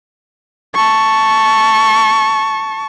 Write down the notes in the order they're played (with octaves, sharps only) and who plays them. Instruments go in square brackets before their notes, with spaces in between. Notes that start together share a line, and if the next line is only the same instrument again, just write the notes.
[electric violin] A5 C#6